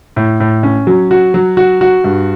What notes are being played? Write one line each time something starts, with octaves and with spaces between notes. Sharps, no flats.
A2
A2
C#4
F#3
F#4
F#3
F#4
F#4
G2